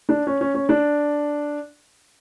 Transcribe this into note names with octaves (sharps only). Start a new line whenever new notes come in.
D4
C#4
C#4
C#4
D4